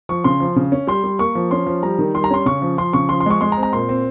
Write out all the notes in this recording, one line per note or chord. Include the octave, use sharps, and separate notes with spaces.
F3 C#6
C#3 C6
F3
C#3
C#4
G3 C6
G3
A#3 C#6
F3
C#4 C6
F3
G3 A#5
D#3
G3 C6
A#5
C#4 C6
C#3 C#6
F3
F3 C6
C#3 C#6
F3 C6
C6
G#3 C#6
G#3 C6
A#5
C4
A#5
A#2 C6
C4